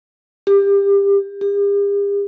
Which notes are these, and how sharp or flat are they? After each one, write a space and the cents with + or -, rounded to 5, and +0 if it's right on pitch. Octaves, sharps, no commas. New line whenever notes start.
G4 +25
G4 +45